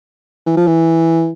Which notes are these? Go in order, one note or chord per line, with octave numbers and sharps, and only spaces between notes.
E3
F3
E3